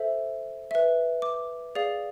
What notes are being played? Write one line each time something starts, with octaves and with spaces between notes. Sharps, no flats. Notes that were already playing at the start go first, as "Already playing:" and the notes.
Already playing: A4 C5 E5
B4 E5
D6
G#4 D5 F5